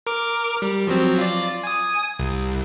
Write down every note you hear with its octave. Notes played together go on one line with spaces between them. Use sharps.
A#4 D6
G3
F3 F#3 C4
F4 D5
G#5 D#6
C2